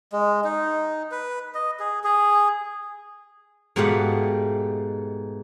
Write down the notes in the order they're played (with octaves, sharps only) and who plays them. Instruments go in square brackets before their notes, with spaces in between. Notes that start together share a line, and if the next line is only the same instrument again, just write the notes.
[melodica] G#3
D#4
B4
D#5
G#4
G#4
[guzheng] G#2 B2 A3 G4 F5 F#5